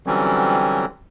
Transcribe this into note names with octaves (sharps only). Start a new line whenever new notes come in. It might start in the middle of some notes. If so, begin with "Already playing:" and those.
D3 E3 F#3 G3 C4 C#4